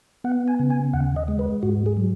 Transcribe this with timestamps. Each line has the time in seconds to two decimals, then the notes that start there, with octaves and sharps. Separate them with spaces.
0.24 B3 F#5
0.48 G#5
0.59 C#3
0.70 G#5
0.93 D#2 F#5
1.16 D#5
1.28 G#3
1.39 B4
1.63 G#2 F#4
1.86 G#4
1.97 F#3